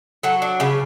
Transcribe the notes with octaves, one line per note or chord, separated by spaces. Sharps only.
F#3 A4
D4
C#3 B4